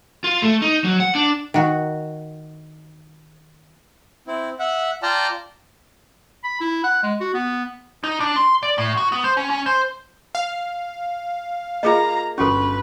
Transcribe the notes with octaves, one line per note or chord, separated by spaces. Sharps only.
F4
A3
D#4
F#3
F#5
D4
D#3 F#4
C4 E4
E5 F#5
F4 D5 G5 A5 A#5 F6
B5
E4
F#5
G#3
F#4
B3
D#4
D4
C6
D5
A2
F#4
B3
C5
C#4
C#4
C5
F5
A#3 F4 G#4 D#5 A#5
G1 C#4 F#4 A4 B4 C#6